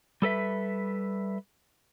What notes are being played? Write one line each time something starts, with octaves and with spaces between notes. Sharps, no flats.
G3 A4 B4 E5